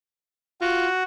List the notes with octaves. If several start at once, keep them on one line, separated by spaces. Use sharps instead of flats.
F4 F#4